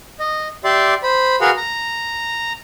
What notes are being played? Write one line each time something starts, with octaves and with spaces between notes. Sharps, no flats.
D#5
G4 D5 E5 C6
C5 B5
F#4 G#4 A#4 B4 F5 F#5
A#5